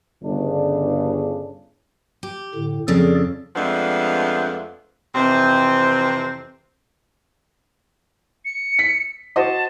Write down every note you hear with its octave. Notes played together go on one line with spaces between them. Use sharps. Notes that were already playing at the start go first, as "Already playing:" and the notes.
G1 C#3 D4
G4
A2 D3
F2 C#3 D4 G#4 A4 D5
F2 F3 G#3 A3 B3 D4
F2 C3 E3 C4
C#7
B6
F#4 C5 D#5 A5